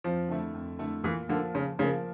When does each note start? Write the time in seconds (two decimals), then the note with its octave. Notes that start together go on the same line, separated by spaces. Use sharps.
0.04 F2 F3
0.29 D3 A3 E4
0.54 F2
0.79 D3 A3 E4
1.04 A#2 E3
1.29 D3 F3 A#3
1.54 A#2 C#3
1.79 C#3 F3
1.82 A#3